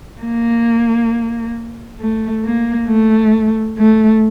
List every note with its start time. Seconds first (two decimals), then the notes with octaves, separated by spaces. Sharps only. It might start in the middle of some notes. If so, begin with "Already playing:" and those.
0.22 A#3
2.00 A3
2.44 A#3
2.88 A3
3.78 A3